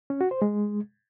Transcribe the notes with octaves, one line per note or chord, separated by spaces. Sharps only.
C#4
F#4
C5
G#3